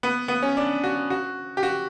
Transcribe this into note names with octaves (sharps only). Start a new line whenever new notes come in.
B3
B3
C#4
D4
F#4
F#4
G4
F#4